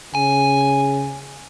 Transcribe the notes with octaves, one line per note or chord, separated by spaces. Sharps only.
C#3 G#5